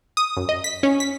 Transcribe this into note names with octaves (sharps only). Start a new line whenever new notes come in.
D#6
F#2
D#5
B6
C#4
B6